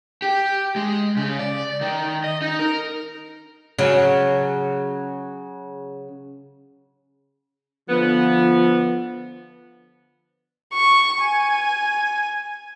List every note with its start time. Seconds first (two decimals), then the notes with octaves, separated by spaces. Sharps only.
0.22 G4
0.76 G#3
1.17 C#3
1.39 D5
1.81 D#3
2.24 D#5
2.42 D#4
2.59 A#4
3.79 C#3 F#3
7.89 D3 F3 B3
10.74 C#6
11.22 G#5